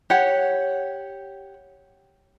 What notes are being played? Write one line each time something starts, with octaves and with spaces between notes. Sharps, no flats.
G4 C#5 F#5